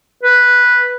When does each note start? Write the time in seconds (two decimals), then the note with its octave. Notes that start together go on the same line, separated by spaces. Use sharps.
0.23 B4